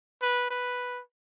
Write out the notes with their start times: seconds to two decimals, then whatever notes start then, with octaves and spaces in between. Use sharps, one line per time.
0.22 B4
0.50 B4